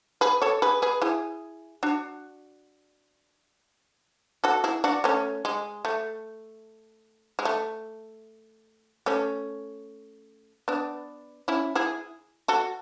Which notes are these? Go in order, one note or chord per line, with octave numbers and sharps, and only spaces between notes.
G#4 B4
A4 C#5
G#4 B4
G#4 B4
E4 G#4
D4 F#4
F#4 A4
E4 G#4
D4 F#4
A3 C#4
G#3
A3
G#3
A3
A3 C#4
B3 D4
C#4 E4
E4 G#4
F#4 A4